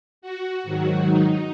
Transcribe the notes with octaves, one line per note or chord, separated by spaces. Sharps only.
F#4
G#2 D#3 F#3 F#4
D#4